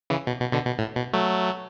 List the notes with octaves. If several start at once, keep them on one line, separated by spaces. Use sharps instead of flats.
C#3 E3
B2
B2
B2 D3
B2
A2
B2
F#3 A3